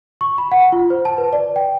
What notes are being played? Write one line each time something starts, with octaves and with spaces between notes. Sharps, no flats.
C#6
B5
F#5
F4
C5
A5
B4
D5
G5